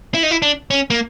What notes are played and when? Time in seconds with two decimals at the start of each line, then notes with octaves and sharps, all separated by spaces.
0.14 E4
0.23 D#4
0.31 E4
0.42 D4
0.71 C#4
0.90 A#3